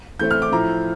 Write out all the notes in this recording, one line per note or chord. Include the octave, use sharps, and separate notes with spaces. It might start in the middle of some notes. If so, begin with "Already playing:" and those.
E3 A3 C4 E4 G6
F6
D6
A2 F3 A3 E4 A#5